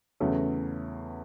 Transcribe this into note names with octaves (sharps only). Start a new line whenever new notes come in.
E2 C#3 F#3 A3